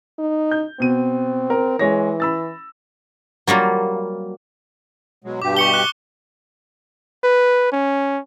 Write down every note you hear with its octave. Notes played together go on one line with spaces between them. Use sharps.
D#4
G6
B2 C4 D#7
A#4
E3 G#3 C#5 A#6
B5 E6 A6
F#3 G3 A#3 F4
B2 F#3 G#3
G2 B2 G4 D6
C#6 C#7 G7
F#6
B4
C#4